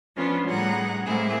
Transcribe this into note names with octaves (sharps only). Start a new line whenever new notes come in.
F3 B3 C#4 D4 F4
A2 G3 G#4 F#5 A#5
A2 G#3 A#3 C4 E4 G#4